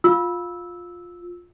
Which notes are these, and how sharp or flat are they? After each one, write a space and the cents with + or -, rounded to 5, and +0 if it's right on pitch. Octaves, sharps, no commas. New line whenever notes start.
F4 +15 E6 -10